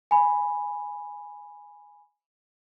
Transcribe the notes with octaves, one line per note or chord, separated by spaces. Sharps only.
G#5 B5